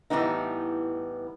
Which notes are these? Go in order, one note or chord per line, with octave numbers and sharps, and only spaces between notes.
A2 E3 G3 B3 D#4